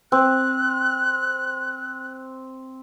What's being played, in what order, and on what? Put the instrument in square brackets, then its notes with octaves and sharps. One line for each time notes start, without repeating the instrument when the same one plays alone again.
[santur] C4 [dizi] F#6